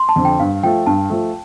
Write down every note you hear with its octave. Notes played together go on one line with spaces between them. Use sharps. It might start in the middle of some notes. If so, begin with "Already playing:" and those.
Already playing: C6
A5
F2 D3
G5
G2 F5
F3 A3 G5
G2 A5
F3 A3